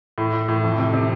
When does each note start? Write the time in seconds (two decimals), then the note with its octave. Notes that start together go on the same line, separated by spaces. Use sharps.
0.18 A2
0.33 A2
0.48 A2
0.63 F2
0.78 C3
0.93 C3